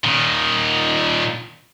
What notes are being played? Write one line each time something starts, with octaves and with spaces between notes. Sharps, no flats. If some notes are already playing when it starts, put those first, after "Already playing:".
A#2 D#3